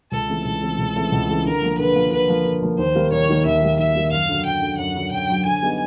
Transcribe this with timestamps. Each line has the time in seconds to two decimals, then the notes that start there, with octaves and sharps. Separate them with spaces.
0.12 C#2 A4
0.29 C#3 E3 A3 C4
0.45 C#2 A4
0.62 C#3 E3 A3 C4
0.78 C#2
0.95 C#3 E3 A3 C4
1.12 C#2
1.28 C#3 E3 A3 C4
1.45 D3 A#4
1.62 F3 A#3
1.78 D3 B4
1.96 F3 A#3
2.11 D3 B4
2.29 F3 A#3
2.45 D3
2.62 F3 A#3
2.78 D#2 C5
2.95 D#3 G3 A#3
3.11 D#2 C#5
3.29 D#3 G3 A#3
3.45 D#2 E5
3.61 D#3 G3 A#3
3.79 D#2 E5
3.95 D#3 G3 A#3
4.11 F#2 F5
4.29 D3 F#3
4.45 F#2 G5
4.62 D3 F#3
4.79 F#2 F#5
4.95 D3 F#3
5.12 F#2 G5
5.28 D3 F#3
5.45 D3 G#5
5.62 G3 B3 D#4 G4